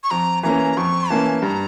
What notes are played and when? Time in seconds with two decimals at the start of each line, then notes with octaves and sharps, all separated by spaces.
0.04 C#6
0.11 F2 A#5
0.43 E3 A#3 C#4 A#5
0.77 F2 C#6
1.10 E3 A#3 C#4 A5
1.42 G2 A#5